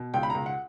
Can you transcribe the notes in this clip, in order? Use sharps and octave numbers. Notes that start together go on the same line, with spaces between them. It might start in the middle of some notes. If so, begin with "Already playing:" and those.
Already playing: B2
C#2 G5
B5
C#2 A#5
F#5